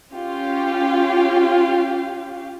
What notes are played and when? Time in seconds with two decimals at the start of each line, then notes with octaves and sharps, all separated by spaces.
0.13 C#4 F4 G4 F5